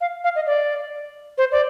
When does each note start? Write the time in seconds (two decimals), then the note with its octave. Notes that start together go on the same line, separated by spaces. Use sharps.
0.01 F5
0.24 F5
0.35 D#5
0.46 D5
1.38 C5
1.52 D5